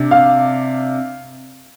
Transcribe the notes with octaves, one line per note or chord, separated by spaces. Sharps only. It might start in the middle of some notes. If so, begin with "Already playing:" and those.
Already playing: C3 D4
F5